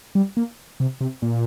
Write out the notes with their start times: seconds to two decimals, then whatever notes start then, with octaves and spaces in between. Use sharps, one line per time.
0.15 G3
0.37 A#3
0.80 C3
1.01 C3
1.22 A#2